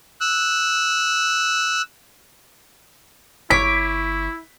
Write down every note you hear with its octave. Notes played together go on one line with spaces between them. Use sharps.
E6 F#6
G1 E4 C#5 D6 B6